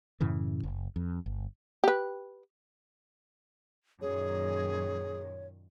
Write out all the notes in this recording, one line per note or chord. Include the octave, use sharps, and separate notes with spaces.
F#2 A2 C#3 E3
F#1
F2
G1
G4 B4
F#2 A#2 D#3 G#4 C#5